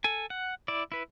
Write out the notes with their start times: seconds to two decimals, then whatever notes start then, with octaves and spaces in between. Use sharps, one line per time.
0.04 A4 G#5
0.30 F#5
0.68 E4 D5
0.92 E4 B4